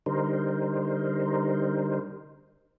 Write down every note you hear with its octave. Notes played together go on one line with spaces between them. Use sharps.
D3 G3 D#4 A#4 C5